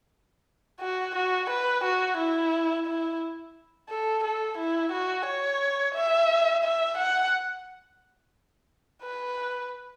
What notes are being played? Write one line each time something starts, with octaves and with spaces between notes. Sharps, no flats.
F#4
F#4
B4
F#4
E4
E4
A4
A4
E4
F#4
C#5
E5
E5
F#5
B4